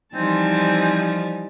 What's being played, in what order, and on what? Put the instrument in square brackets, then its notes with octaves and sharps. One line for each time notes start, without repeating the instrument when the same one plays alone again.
[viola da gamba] E3 G3 D#4 [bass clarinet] F3 [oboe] C4 [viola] G#5 A5